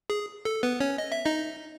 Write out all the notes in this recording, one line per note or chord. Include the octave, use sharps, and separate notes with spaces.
G#4
A4
B3 B4
C#4 C#5
D#5
E5
D#4 D#5